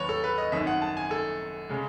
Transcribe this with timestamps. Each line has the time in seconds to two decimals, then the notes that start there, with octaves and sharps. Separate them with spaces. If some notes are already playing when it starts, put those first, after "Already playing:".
Already playing: D#2 F#3 B4 C#5
0.09 A4
0.24 B4
0.38 D#5
0.52 G#1 F#2 D#3 E5
0.67 F#5
0.82 A5
0.97 G#5
1.11 A4
1.69 C#3 G#3